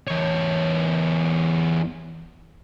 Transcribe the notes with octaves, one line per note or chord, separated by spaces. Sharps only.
E2 C#5